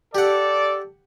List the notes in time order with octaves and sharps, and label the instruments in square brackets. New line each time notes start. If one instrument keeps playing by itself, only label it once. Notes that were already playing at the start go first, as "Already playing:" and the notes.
[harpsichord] G4 F#5 [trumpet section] A4 D5